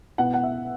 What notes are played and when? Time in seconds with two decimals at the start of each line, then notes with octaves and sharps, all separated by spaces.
0.18 B2 B3 E4 F#5
0.34 F#5
0.43 E5